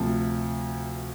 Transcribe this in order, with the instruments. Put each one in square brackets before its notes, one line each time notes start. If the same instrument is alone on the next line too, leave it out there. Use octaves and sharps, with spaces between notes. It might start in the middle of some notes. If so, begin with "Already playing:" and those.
Already playing: [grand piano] D2 C3 F3